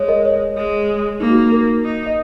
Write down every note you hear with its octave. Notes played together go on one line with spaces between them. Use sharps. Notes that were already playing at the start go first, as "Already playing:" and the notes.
Already playing: G#3 C#5
A#4 D#5
C#5
G#3
A#3 D#4
F#4
A#4
D#4
D#5